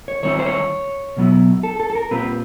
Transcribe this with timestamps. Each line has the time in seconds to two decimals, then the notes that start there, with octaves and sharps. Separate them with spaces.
0.08 C#5
0.23 D#3 G3 C4 E4 C#5
0.39 C5
0.46 C#5
1.17 B2 F#3 B3 E4
1.63 A4
1.80 A4
1.90 A4
1.95 A#4
2.11 A#2 G3 C4 F4 B4